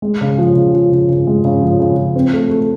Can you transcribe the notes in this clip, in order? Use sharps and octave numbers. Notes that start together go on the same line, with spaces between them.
G#3
C#3
F3
C#3
F3
C#3
C#3
G#3
C#3
F3
C#3
F3
C4
A3
A3